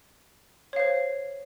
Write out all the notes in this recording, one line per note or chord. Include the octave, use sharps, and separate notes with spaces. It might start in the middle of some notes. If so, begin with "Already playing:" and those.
C5 C#5 F5